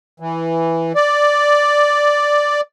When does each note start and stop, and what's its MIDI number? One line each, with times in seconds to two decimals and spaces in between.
0.20 0.92 52
0.95 2.61 74